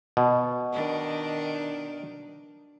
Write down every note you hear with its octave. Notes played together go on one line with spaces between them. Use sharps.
B2
D#3 D4